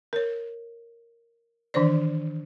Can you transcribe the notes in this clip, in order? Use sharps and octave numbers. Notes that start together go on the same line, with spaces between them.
A#4 C#5
D#3 E3 D4 C5 D5